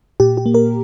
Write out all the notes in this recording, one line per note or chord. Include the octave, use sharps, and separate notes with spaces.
A#2 G4
G4
A#3
A#4